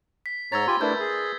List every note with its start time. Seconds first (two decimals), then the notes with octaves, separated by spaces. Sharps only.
0.26 B6
0.52 G#2 C#5 A#5 E6 G#6 A6
0.68 F4 G4 G#5 B5 C6
0.81 A3 D4 E4 A#4 B4 E5 G6
1.00 G#4